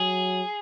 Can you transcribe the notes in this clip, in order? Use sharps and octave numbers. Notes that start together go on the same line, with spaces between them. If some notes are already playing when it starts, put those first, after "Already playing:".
Already playing: F#3 G#4